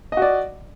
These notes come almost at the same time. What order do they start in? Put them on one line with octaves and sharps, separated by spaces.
D#5 F#4 D5